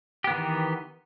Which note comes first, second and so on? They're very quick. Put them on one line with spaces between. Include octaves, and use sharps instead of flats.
G4 B3 D#3 E3